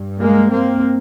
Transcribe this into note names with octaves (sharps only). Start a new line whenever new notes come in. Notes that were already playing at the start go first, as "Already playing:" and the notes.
Already playing: G2
G#3 A#3
A#3 C4